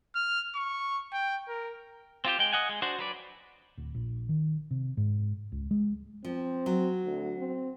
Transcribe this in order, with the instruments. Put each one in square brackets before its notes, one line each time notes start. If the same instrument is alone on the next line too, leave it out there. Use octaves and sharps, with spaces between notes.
[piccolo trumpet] F6
C#6
G5
A#4
[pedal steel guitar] C4 F4 G4 C5
G#3 G5
D#5 F#5 G#5
G#3
D4 F#4 C5
F#3 B4 D5
[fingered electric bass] D1
A#1
D#3
C3
G#2
C#2
G#3
[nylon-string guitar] F3 [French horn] C4
[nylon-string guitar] F#3
[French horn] D2
C4